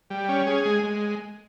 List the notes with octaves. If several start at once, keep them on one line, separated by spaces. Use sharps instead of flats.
G3
C#4
G#4
G#3
G#3